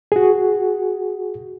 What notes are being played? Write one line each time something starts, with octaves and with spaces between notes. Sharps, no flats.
F#4 G#4